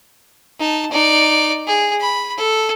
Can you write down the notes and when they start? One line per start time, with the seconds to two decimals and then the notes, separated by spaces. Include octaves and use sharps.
0.59 D#4 A5
0.91 D#4 D5
1.67 G#4
2.00 B5
2.37 A4